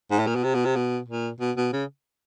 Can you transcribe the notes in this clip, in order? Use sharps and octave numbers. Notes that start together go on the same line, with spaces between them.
G#2
A2
A#2
B2
C3
B2
C3
B2
A#2
B2
B2
C#3